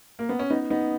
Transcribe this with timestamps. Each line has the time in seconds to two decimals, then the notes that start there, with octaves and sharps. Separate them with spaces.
0.19 A#3
0.29 B3
0.39 C#4
0.50 B3 D#4
0.70 B3 D#4